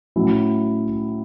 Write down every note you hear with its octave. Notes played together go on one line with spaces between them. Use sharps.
A2 F#3 C#4 E4